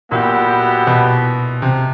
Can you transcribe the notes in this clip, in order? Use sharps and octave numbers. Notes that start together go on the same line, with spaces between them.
A#2 F#3 B3 E4 G4
B2
C3